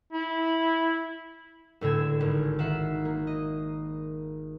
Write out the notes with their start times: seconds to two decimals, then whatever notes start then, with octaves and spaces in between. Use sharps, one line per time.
0.13 E4
1.81 C#2 A2 D3 E6 G#6
2.20 G#1
2.59 D#3 E5 F#5 C7
3.05 A#3
3.27 D#5